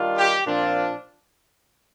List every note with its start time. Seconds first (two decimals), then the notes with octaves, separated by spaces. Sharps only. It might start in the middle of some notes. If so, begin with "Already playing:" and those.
Already playing: D#3 G3 D4 F4
0.18 G4
0.46 A#2 F3 C4 D4 F4